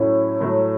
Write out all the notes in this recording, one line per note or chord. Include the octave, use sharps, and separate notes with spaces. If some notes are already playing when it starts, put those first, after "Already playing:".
Already playing: A2 F#3 C#4 E4
A2 F#3 A3